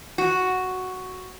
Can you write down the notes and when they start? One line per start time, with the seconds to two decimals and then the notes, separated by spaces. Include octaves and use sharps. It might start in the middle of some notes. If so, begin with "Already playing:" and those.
0.18 F#4